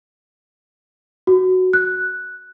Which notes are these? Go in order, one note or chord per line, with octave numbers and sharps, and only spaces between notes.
F#4
F#6